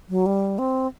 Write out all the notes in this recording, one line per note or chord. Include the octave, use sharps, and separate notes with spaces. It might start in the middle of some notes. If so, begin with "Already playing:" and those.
F#3
G3
C4